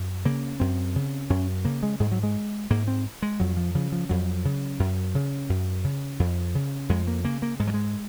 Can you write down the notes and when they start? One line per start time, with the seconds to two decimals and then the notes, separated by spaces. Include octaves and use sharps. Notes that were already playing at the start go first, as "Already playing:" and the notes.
Already playing: F#2
0.25 C#3 A#3
0.60 F#2 C4
0.96 C#3
1.30 F#2 C#4
1.65 C#3 A#3
1.83 G#3
2.00 G#2 G#3
2.12 F#3
2.23 G#3
2.70 G#2 A#3
2.88 C4
3.22 G#3
3.40 F2 F#3
3.57 F3
3.75 C#3 F3
3.92 F3
4.09 F2 F#3
4.45 C#3
4.80 F#2
5.15 C#3
5.49 F#2
5.84 C#3
6.20 F2
6.55 C#3
6.89 F2 G#3
7.07 A#3
7.24 C#3 A#3
7.42 A#3
7.60 G#2 G#3
7.67 F#3
7.74 G#3